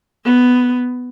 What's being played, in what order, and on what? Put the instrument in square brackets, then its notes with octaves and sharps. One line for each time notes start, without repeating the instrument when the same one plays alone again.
[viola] B3